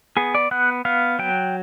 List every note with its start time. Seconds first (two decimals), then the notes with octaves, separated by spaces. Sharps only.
0.17 B3 G#4
0.35 D5
0.51 B3 F#5
0.85 B3 F5
1.19 F#3 G5